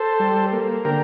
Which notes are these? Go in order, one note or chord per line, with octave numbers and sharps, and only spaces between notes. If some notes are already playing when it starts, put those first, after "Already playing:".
Already playing: A4 C5
G3
A#3
D3 G4 A#4